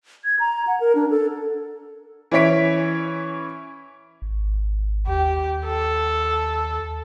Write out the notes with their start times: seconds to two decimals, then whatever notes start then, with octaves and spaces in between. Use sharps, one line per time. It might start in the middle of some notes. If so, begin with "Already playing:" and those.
0.24 G#6
0.40 A#5
0.67 F#5
0.80 A#4
0.95 D4
1.10 A4
2.31 E3 C#4 E4 C#5 B6 D7
4.22 G#1
5.07 D#2 G4
5.66 A4